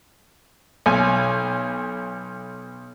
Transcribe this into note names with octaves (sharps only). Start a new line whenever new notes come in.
B1 G#5